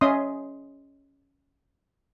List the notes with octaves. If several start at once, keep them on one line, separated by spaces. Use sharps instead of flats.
C#4 D#5 E5 C6 D#6